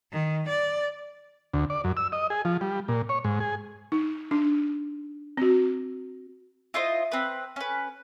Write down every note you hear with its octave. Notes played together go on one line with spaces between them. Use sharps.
D#3
D5
D2
D5
F#2
E6
D#5
G#4
F3
G3
A#2
C#5
G#2
G#4
D#4
D4
C4 F#4
E4 F4 C5 D#5
C4 B4
C#4 B4